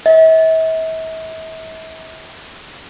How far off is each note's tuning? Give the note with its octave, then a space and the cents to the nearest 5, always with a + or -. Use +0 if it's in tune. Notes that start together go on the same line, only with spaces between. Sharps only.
E5 -40